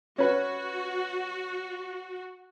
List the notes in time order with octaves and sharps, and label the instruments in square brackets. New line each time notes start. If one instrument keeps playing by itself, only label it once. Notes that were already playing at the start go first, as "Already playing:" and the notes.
[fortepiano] C#4 B4 [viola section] F#4